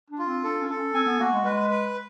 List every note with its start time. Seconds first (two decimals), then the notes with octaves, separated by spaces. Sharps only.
0.11 D4
0.19 F4
0.27 C4
0.44 D4 A4
0.61 C#4
0.69 A4
0.78 C#4
0.94 C4 G#5
1.07 B3
1.19 A#3 F#4
1.33 G#3
1.45 G#3 B4
1.70 B4